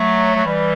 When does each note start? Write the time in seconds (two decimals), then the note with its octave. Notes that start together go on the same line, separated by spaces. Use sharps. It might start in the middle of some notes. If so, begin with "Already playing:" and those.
Already playing: F#3 A3
0.36 F#3
0.45 E3 G3